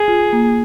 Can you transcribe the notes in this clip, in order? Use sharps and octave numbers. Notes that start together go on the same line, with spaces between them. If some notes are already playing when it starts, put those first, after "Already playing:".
Already playing: G#4
F4
A#3